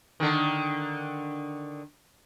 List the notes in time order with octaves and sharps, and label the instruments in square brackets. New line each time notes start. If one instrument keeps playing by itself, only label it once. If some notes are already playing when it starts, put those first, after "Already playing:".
[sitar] D3 D#3